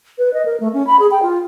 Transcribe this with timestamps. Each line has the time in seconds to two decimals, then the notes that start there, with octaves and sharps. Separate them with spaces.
0.18 B4
0.34 D#5
0.45 A#4
0.60 A3
0.73 C#4
0.87 B5
0.99 G#4
1.11 G5
1.23 F4